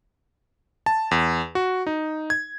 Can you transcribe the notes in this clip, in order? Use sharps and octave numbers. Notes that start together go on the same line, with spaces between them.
A5
E2
F#4
D#4
G#6